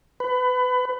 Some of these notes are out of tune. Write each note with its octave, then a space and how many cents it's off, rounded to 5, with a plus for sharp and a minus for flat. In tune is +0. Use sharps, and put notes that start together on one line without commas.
B4 +25